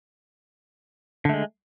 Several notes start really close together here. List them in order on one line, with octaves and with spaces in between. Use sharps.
D3 A3 G#3